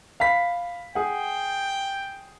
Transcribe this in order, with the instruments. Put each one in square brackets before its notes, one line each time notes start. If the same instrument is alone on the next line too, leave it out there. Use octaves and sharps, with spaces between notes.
[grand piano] F5 B5 B6
[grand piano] G#4 F#5 [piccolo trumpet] G5